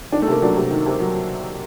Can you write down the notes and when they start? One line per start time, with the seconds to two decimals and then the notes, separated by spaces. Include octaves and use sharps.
0.12 D#3 D4
0.22 A3
0.28 C3 A#3
0.42 F#3 D4
0.56 C3
0.71 D#3
0.86 C3
1.00 F#3